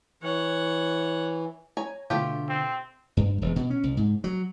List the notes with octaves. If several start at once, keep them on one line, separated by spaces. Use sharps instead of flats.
E3 C#5 F#5
C#5 G#5 A#5
B2 D3 A3 F4 G4
C4
G2
E1
B2
C#4
C2
G#2
F#3